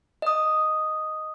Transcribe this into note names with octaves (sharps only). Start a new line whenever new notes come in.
D#5 D#6